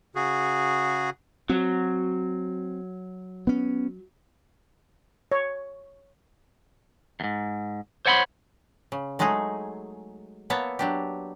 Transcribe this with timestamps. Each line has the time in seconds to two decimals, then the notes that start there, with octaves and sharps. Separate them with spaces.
0.15 C#3 F#4 G#4
1.49 F#3 C4
3.47 B3 C#4
5.32 C#5
7.20 E2 G#2
8.06 C5 C#5 F#5 G#5 B5 C6
8.92 C#3
9.19 F#3 G#3 A3 D#4 G#4
10.50 A#3 B3 C#5 E5 A5
10.79 F#3 D4 G4